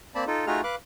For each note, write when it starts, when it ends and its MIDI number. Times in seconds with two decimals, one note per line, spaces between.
0.15 0.24 58
0.15 0.24 60
0.15 0.24 74
0.15 0.24 81
0.15 0.24 83
0.27 0.46 63
0.27 0.46 65
0.27 0.46 69
0.47 0.61 57
0.47 0.61 63
0.47 0.61 65
0.47 0.61 66
0.47 0.61 68
0.47 0.61 89
0.64 0.75 71
0.64 0.75 77
0.64 0.75 86
0.64 0.75 90